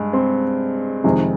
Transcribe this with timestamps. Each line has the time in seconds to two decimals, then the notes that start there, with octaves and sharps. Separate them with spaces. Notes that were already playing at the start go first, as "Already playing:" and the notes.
Already playing: G2 G#3
0.13 C4
1.04 F1 F2 C3 D#3 G#3